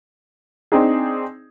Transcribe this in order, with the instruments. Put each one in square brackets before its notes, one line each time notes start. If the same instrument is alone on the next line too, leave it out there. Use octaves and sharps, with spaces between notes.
[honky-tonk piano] C4 D4 D#4 G#4